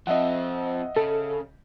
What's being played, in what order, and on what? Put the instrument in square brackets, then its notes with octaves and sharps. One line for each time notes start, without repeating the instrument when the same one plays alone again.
[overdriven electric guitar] F3 C4 [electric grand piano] D#5 E5 F#5
[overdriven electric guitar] C#3 [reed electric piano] A4